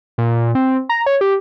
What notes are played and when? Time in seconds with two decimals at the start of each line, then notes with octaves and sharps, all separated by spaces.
0.18 A#2
0.55 C4
0.89 A#5
1.06 C#5
1.21 G4